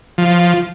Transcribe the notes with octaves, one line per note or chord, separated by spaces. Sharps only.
F3